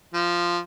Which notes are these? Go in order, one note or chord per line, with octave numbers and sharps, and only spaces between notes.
F3